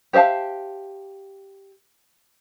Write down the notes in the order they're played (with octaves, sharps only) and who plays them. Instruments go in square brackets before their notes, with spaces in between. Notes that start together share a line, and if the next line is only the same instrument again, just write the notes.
[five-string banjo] G4 C5 E5 F5 A5